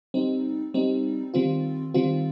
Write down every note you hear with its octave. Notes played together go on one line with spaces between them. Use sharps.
G3 C4 D#4
G3 C4 D#4
D#3 G3 C4 F4
D#3 G3 C4 F4